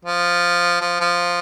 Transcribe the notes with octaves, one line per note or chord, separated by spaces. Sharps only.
F3
F3
F3